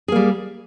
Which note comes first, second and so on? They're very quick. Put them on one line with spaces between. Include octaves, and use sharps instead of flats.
G#4 A#3 G3